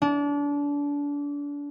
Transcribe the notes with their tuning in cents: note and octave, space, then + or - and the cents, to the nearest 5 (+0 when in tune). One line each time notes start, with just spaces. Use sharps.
D4 -30